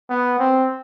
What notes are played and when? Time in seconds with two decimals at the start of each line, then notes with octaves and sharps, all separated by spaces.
0.10 B3
0.39 C4